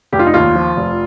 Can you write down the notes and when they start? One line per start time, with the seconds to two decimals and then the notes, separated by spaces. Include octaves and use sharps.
0.12 F1 G4
0.19 F4
0.26 D#4
0.34 D#2 F4
0.55 F3
0.77 F1